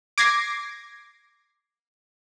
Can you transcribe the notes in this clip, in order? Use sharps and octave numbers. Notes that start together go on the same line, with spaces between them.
D6 G#6 A#6 C7